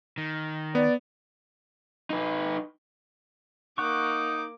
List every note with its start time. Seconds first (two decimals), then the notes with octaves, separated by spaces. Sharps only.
0.18 D#3
0.75 B3 D5
2.10 D#4 B4
3.78 A#3 D#4 F#5 C#6 D6